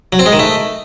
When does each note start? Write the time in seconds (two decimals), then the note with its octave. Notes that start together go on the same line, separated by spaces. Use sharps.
0.13 F#3
0.19 C4
0.26 G#3
0.33 D#3
0.39 A3